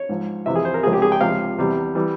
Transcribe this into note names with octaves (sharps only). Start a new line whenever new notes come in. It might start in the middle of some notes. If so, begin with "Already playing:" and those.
Already playing: C#5
G#2 F3
F2 C3 E3 E5
G#4
C5
A#4
C#2 C3 F3 G#4
G4
G#4
G5
C#2 C3 F3 F5
E2 C3 G3
E3 G3